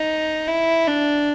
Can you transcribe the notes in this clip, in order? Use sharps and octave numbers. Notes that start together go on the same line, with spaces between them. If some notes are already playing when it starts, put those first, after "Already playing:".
Already playing: D#4
E4
D4